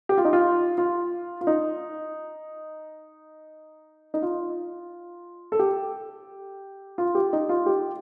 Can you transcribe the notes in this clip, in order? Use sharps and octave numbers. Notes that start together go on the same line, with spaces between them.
G4
F4
D#4
F4
F4
F4
D#4
D#4
F4
A4
G4
F4
G4
D#4
F4
G4